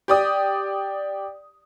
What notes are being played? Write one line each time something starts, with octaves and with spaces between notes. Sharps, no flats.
G4 D5 D#6